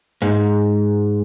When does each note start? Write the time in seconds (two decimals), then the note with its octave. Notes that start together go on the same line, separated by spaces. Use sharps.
0.22 G#2